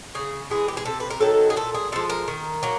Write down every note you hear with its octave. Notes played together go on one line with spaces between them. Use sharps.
C#3 G#4
E3 G#3 G#4
G4
G#4
C3 A4
B4
A#4
D#3 F#3 A4
G#4
A#2 A4
G#4
F3 G#3 A4
A#4
D#3
F#3 A#3